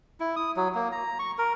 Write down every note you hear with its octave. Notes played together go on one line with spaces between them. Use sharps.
E4
D#6
F#3
A#3
A#5
C#6
A#4